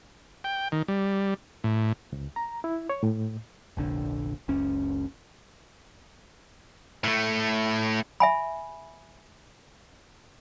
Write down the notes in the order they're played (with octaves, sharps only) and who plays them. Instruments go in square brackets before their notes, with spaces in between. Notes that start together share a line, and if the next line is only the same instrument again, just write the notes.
[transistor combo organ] G5
D#3
G3
A2
[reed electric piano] C#2
A#5
E4
C#5
A2
[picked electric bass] F1 A#1 D3
F#1 C#2 C#4
[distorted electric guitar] A2 A3
[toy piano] E5 G#5 B5